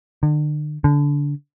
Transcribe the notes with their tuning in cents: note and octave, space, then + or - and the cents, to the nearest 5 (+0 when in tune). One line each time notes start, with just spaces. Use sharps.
D3 +40
D3 -25